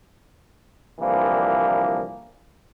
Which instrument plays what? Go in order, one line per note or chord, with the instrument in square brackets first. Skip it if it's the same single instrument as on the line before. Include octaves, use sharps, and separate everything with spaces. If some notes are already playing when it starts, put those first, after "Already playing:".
[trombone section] C2 D3 E3 F3 A#3